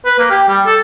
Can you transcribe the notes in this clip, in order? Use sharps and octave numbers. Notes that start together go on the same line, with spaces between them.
B4
A#3
G4
G3
A4